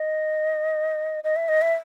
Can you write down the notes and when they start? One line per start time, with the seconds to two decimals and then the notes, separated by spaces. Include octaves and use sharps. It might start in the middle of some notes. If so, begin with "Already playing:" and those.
Already playing: D#5
1.24 D#5
1.36 E5
1.49 D#5
1.62 E5